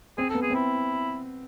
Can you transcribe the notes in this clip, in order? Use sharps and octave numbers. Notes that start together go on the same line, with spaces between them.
C4 G#4
B3 A4
G#4
C4
E4